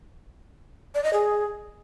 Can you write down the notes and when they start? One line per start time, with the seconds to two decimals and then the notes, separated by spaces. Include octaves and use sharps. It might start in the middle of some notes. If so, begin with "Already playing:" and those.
0.95 D5
1.04 D#5
1.13 G#4